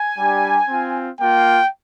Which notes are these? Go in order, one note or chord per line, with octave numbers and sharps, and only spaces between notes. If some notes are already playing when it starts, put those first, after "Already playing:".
Already playing: G#5
G3 D4 G4
C4 F4
A#3 F4 G5